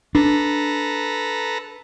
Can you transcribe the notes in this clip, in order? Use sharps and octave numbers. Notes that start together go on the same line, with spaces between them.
D4 A4 B4 A#5